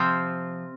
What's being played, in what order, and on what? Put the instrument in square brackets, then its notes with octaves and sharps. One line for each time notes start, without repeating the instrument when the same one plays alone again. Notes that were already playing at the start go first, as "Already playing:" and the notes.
Already playing: [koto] C3 F3 C4 F4